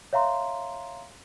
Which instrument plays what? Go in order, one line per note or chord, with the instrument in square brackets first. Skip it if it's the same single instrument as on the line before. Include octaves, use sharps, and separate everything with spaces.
[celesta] C#5 E5 F5 A#5 C6